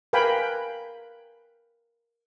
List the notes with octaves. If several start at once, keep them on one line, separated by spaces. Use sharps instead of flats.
A#4 B4 F5 G5 G#5 B5